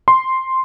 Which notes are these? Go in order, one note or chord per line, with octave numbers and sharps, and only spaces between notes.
C6